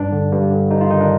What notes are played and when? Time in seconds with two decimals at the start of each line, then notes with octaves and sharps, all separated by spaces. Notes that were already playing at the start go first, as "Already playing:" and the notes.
Already playing: G2 D4
0.12 D3
0.32 G2
0.51 D3
0.70 G2 D#4
0.81 F4
0.90 D#3 D#4
1.00 D4